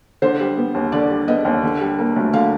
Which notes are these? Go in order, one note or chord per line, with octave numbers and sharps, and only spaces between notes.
D3 C5
G3
B3
D#2
D3 D5
G3
B3 D#5
D#2
D3
G3
A#3
D2
D3 F5